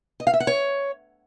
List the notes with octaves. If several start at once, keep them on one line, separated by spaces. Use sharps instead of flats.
D#5
F5
E5
F#5
C#5